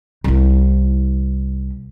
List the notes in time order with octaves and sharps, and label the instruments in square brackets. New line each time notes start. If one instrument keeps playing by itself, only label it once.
[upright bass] C2 E4